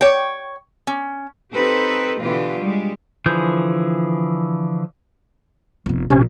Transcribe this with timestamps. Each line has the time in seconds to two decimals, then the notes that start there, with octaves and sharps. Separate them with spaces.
0.01 C#5 G5
0.87 C#4
1.54 C4 D#4 G4 A4 B4
2.23 B2 D3 E3 B3 F4 G4
2.60 G3 G#3
3.26 D3 E3 F3 G#4 G6
5.86 F1 B3
6.10 A#1 C3 C#4